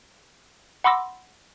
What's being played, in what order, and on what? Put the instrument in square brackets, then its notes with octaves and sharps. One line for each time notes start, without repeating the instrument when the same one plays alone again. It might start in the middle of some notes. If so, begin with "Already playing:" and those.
[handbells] F#5 B5 C6 D6 E6 A#6